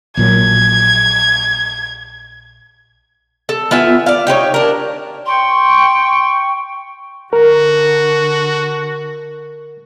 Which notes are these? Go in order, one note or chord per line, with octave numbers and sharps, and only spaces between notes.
A#1 A#2 F#3 G#6
A4
B3 F4 E5 G#5
D5 F5
D#4 G4 B4 C#5
D4 A#4
G5 C6 C#6
D3 F#4 A#4